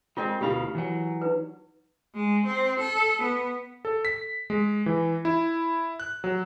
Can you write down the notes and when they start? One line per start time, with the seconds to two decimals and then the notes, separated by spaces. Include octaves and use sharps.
0.17 G#3 C4 F4 A#4 D#5
0.41 D2 B2 E4 F4 G4 F5
0.75 E3 F#3
1.22 D#4 B4
2.14 G#3
2.46 C4
2.80 A4
3.23 B3
3.85 A4
4.05 B6
4.50 G#3
4.86 E3
5.25 E4
6.00 F#6
6.24 F#3